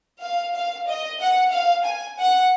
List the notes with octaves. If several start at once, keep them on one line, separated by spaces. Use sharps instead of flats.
F5
F5
D#5
F#5
F5
G#5
F#5